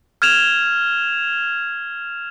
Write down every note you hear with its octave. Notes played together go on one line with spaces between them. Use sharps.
F6 G#6 E7 F7